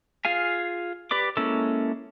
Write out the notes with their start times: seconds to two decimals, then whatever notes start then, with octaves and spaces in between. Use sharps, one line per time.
0.25 F4 G#4 F5 G#5
1.11 G4 B4 D5 D6
1.37 G#3 A#3 C#4 E4 A4